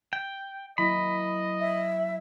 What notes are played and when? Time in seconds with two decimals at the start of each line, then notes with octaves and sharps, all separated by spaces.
0.13 G5
0.78 F#3 A#3 E4 D#5 B5
1.61 E5